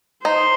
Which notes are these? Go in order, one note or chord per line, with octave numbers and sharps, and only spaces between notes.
D#4 C5